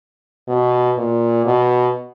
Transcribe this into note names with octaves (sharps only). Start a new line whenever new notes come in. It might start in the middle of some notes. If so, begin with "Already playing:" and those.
B2
A#2
B2